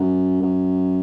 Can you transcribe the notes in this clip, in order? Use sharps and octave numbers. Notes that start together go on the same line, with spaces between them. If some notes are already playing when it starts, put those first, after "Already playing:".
Already playing: F#2
F#2